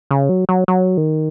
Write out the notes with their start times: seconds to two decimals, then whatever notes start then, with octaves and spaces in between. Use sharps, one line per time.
0.11 C#3
0.29 F#3
0.49 F#3
0.68 F#3
0.97 D#3